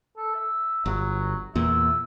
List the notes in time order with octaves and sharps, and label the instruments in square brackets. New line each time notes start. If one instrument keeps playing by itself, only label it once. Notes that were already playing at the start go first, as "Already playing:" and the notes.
[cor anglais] A4
E5
[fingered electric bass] G1 [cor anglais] F#3
[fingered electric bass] E2 A#2 [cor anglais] E5